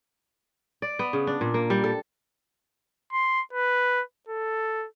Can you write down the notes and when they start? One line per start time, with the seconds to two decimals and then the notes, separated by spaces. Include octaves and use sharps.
0.82 D5
0.99 B3
1.13 C#3
1.27 D4
1.41 A#2
1.54 A#3
1.70 G3
1.84 A4
3.13 C6
3.53 B4
4.28 A4